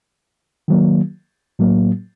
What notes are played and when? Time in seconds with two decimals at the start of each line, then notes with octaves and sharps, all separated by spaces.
0.68 D#3 F#3 A#3
1.59 A2 F#3 A#3